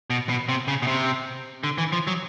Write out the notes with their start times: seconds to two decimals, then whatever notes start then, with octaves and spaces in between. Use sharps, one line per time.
0.10 B2
0.29 B2
0.49 C3
0.68 C#3
0.82 B2
0.87 C3
1.64 D3
1.78 E3
1.92 F3
2.07 F#3